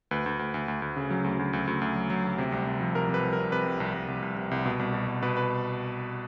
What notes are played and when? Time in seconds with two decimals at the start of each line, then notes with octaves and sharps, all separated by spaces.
0.11 D2 B4
0.26 D2
0.39 D2
0.54 D2
0.68 D2
0.82 D2
0.96 C#3
1.11 F#3
1.24 D2
1.39 D2
1.53 D2
1.67 D2
1.81 D2
1.96 F#3
2.10 F#3
2.24 D2
2.38 C3
2.52 C2
2.67 C2
2.80 F3
2.95 C2 A#4
3.09 C3
3.14 B4
3.23 C2
3.33 A#4
3.38 C2
3.52 C3 B4
3.66 C2
3.80 C2
3.94 C2
4.08 C2
4.22 C2
4.37 C3
4.51 C2
4.65 B2
4.79 C2
4.94 B2
5.08 C2
5.23 B2 B4
5.37 B4